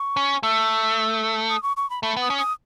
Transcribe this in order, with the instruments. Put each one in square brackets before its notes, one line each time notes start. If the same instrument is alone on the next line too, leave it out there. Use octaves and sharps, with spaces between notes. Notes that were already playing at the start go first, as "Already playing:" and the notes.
Already playing: [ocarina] C#6
[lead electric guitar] C#4
[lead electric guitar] A3 [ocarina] E6
[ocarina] D#6
C#6
C#6
B5
[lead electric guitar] A3 [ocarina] B5
[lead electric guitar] B3
[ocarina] D#6
[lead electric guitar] C#4
[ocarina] D#6